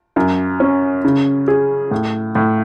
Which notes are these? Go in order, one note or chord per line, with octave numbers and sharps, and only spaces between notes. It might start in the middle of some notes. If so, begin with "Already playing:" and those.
F#2
C#4
C#3
G#4
A2
A2